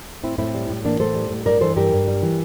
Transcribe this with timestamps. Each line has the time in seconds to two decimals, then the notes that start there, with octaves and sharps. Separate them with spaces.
0.23 A2 C4 E4
0.38 A2 C4 E4
0.54 G3
0.70 A2
0.85 E3 A#3 D4
1.00 A2 A4 C5
1.15 G3
1.30 A2
1.46 G2 A#4 D5
1.61 E3 A4 C5
1.76 G2 G4 A#4
1.92 G2
2.08 G3
2.23 E3